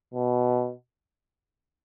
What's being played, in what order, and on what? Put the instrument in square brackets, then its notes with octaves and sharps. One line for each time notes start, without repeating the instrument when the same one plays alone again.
[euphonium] B2